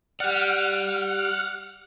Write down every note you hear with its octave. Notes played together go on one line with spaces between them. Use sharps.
G4 D5 F#5 F6